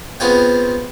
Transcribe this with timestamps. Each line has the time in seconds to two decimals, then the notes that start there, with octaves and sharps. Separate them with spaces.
0.20 B3 C4 F4 G#4 C#5 G5